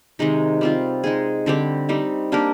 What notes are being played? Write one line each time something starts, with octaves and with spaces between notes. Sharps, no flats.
C3 D#3 G#3 D#4
G3 C4 F4
G#3 D#4 G#4
D3 G3 C4 G4
G3 C4 D#4
A#3 D4 G4 A#4